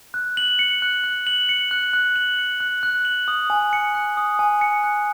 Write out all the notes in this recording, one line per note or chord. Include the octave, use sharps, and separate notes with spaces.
F#6
F#7
C#7
F#6
F#6
F#7
C#7
F#6
F#6
F#7
C#7
F#6
F#6
F#7
D#6
G#5
C#7
F#6
D#6
G#5
C#7
F#6